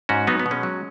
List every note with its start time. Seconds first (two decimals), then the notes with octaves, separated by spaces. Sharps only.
0.09 G#2 C#4 F#4
0.27 F#3 B3 D#4
0.40 B3
0.46 B2
0.51 G#3 C#4
0.63 F#3